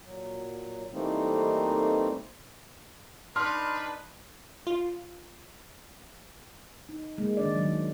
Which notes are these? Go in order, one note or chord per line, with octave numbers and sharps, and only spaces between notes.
A#2 F#3
E3 G3 A3 A#3 C4 D#4
D4 D#4 B4 C6 F6
F4
D#4
G#3 A#3
D#3 D4 D5
D#3 F#3